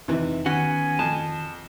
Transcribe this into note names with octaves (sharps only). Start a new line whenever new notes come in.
F2 C3 E3 D#4
D#3 B3 C#4 F#4 F#5 G#5
F2 A5